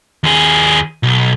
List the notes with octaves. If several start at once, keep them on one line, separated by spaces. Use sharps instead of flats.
D#2 G#4
B1